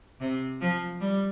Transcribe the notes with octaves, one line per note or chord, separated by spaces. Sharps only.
C3
F3
G3